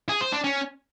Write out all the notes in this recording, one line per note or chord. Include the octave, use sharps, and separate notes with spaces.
G#4
C5
D4
C#4